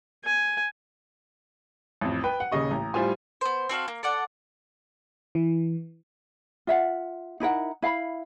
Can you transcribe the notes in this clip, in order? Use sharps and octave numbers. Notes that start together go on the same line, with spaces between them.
G#5
A1 F2
B4 G5
F#5
D#1 C#3 D#5 C#6
A1 A#5
A2 G3 F4 C5 G#5
B3 C5
C4 F#4 A4 F5
A#3
A4 D5 F#5
E3
F4 E5 F#5
D#4 E4 A#4 F#5
E4 F5 G#5 B5